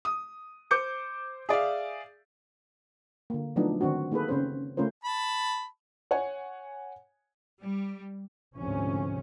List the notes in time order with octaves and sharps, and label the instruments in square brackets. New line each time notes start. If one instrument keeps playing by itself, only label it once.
[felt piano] D#6
C5 D6 G6 C#7
G#4 D5 E5 F5
[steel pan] D3 A#3
F3 F#3 A3 B3 D4 D#4
D3 D#3 C4 D4 F#4
A#3 D#4 G#4 A4 B4
C#3 C4 C#4 B4 C5
C#3 A3 C#4 F4 A#4 C5
[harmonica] A5 B5
[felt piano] C#5 F#5 G#5
[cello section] G3
[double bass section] D2 G#2 C3 F3 C#4